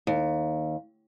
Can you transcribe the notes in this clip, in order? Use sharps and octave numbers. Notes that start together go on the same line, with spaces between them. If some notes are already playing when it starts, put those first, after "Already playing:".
D#2